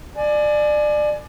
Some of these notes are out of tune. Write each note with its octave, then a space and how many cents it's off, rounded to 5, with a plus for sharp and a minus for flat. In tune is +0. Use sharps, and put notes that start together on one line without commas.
D5 +25 G#5 +30